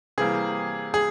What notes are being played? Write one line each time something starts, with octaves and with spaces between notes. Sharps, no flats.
C3 E3 G3 A#3 G#4
G#4